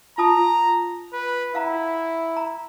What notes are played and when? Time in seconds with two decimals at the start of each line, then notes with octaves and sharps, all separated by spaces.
0.18 F4 A5 A#5 D#6
1.13 B4
1.55 E4 F5 F#5 A#5
2.37 A#5